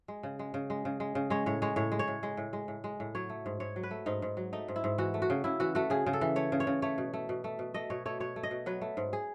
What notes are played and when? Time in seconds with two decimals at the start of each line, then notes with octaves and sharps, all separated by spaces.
0.08 G#3
0.23 C#3
0.39 G#3
0.54 C#3
0.70 G#3
0.85 C#3
1.00 G#3
1.15 C#3
1.30 G#3 C#5
1.46 A2 C#5
1.62 G#3 C#5
1.76 A2 C#5
1.92 G#3
1.99 C#5
2.08 A2
2.23 G#3
2.37 A2
2.53 G#3
2.68 A2
2.84 G#3
3.00 A2
3.15 F#3 C#5
3.30 A3
3.46 G#2
3.60 G#2 C#5
3.76 F#3
3.83 B4
3.91 A3
4.06 G#2 D#4
4.22 G#2
4.37 F#3
4.53 A3 D#4
4.68 G#2
4.76 E4
4.84 G#2
4.98 E3 F#4
5.14 A3
5.22 F#4
5.30 C#3
5.44 C#3 E4
5.60 E3 F#4
5.75 A3 F#4
5.90 C#3 G#4
6.06 C#3
6.13 A4
6.21 E3
6.36 A3 C#5
6.52 C#3
6.60 C#5
6.67 C#3
6.82 A3 C#5
6.98 B2
7.14 A3
7.29 B2
7.44 A3
7.59 B2
7.74 A3 D#5
7.90 B2 C#5
8.06 A3 C#5
8.20 B2 C#5
8.36 A3
8.43 D#5
8.51 B2
8.66 F#3 B4
8.81 A3
8.97 G#2
9.13 G#4